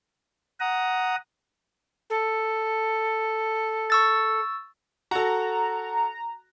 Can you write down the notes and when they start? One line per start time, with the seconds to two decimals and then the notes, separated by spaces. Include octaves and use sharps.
0.60 F#5 A#5 D#6
2.09 A4
3.90 C#6 E6 A6
5.11 F#4 A4 A#5